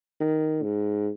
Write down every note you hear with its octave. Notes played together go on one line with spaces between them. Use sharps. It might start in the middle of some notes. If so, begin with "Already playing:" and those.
D#3
G#2